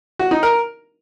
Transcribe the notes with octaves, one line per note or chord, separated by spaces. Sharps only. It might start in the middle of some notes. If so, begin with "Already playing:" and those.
F#4
D#4
A#4